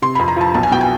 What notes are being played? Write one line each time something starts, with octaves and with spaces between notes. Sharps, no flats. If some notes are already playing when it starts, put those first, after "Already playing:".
C3 C6
F2 B5
A#5
F3 A5
B1 A5
G#5
B2 G5
G#5